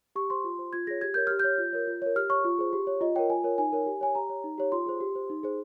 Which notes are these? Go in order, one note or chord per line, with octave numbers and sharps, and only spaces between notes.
G4 C#6
C5 C6
F4
C5
F4 G#6
G#4 C#5 A#6
G4 G#6
A#4 C#5 G6
G4 F6
C#5 G6
F4
A#4 C#5
F4
A#4 C#5
G4 F6
C#5 C#6
F4
G#4 C5
G4
C#5
F4 D#5
A#4 C#5 G5
F4 G#5
A#4 C#5
D#4 G#5
A#4 C#5
G4
C#5 G#5
G4 A#5
C#5
D#4
G4 C#5
F4 C6
G#4 C5
G4
C5
D#4
G#4 C5